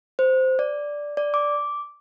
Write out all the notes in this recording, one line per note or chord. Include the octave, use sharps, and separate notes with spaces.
C5
D5
D5
D6